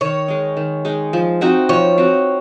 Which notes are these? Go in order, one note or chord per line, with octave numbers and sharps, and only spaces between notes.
D#3 C#5
G#3 D#4
D#3
G#3 D#4
F3
C4 D#4 F#4
F3 C#5
C4 D#4 F#4